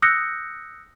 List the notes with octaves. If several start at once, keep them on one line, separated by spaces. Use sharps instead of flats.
D#6 E6 F#6 G6 A#6 C#7